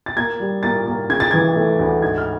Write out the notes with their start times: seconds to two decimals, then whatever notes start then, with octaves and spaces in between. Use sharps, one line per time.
0.06 A6
0.16 A#3 G#6
0.40 G3
0.63 A#3 A6
0.86 A#3
1.10 C#3 G#6
1.20 A6
1.31 E3 G#6
1.56 A3
1.79 D2
2.02 G#2 G#6
2.18 F6